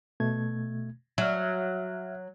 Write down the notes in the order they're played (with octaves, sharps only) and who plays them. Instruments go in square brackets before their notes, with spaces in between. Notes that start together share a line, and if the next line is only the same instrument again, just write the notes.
[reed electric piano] B2 A3 G#6
[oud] F#3 [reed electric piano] E5 F6